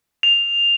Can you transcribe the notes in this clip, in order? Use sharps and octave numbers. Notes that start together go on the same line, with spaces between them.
F7